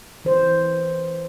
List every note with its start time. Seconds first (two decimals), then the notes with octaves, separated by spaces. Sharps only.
0.25 E3 C5